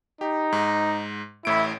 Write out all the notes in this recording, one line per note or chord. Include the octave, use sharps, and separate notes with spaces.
D#4 G4
G#2
A1 A2 E4 D7